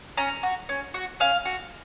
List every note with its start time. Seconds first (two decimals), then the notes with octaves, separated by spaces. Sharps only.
0.17 C#4 A#5
0.43 F#4
0.69 C#4
0.94 F#4
1.20 C#4 F5
1.45 F#4